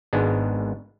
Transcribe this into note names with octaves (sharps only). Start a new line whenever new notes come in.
G#1 G#2 G#3 B3 D4